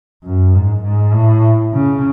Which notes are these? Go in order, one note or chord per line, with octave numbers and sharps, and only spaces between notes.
F#2
G#2
G#2
A2
C#3